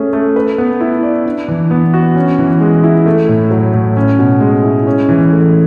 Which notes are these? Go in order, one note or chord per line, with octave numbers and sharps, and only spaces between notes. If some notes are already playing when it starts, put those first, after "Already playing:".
Already playing: A3 C#4 G#4
A3
B4
B3
E4
D5
D4
E3
B3
F#4
C#4
E3
G#3
E4
A3
A2
F#3
A2
C#4
B2
G#3
E4
C#4
E3
A3